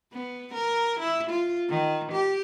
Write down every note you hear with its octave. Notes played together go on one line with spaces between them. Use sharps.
B3
A#4
E4
F4
D#3
G4